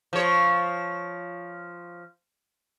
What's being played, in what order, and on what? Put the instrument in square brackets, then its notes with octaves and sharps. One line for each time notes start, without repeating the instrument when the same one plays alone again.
[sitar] F3 C#5